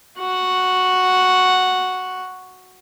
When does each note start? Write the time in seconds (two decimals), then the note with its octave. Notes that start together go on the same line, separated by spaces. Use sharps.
0.19 F#4 F#5